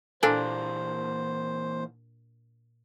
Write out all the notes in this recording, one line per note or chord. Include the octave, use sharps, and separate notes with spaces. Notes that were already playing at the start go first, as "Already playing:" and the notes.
A#2 E3 A#3 D4 A4 C5 G#5